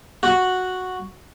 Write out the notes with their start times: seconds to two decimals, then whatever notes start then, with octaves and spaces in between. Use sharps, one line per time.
0.23 F#4